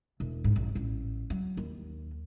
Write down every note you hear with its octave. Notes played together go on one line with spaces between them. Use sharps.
E1
G#2
A#1
A1
F#3
D#2